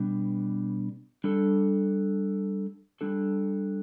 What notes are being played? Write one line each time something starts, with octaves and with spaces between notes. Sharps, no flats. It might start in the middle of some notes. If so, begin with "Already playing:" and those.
Already playing: B2 G3 B3 D4
G3 D4 A4
G3 D4 A4